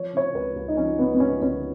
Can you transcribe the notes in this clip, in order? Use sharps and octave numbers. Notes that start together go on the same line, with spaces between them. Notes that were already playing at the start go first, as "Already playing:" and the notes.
Already playing: F3 C#5
C#3 C#5
C#2 B4
C#2
D#4
F3 C#4
C#3 B3
B3
C#2 C#4
C#2 C#4